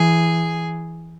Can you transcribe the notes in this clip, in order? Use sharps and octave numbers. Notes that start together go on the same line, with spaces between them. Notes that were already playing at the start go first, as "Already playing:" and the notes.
Already playing: E3 G#4